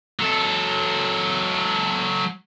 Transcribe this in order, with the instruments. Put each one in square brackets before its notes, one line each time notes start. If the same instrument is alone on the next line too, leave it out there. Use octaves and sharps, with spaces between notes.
[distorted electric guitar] F#3 A4